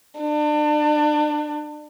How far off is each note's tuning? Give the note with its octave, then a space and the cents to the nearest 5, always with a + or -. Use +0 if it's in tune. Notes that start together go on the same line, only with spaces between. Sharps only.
D4 +30